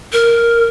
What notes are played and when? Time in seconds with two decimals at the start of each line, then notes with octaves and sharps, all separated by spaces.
0.12 A#4